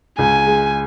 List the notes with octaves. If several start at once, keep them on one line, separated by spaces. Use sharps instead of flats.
C#2 G#5
G#3